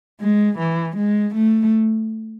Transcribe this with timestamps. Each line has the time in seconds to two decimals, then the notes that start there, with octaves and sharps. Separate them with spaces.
0.20 G#3
0.58 E3
0.96 G#3
1.34 A3